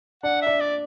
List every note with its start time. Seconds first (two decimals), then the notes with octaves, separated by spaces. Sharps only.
0.23 D4 F#5
0.42 D4 E5
0.60 D5